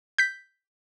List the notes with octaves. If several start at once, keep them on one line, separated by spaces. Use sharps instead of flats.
G6 B6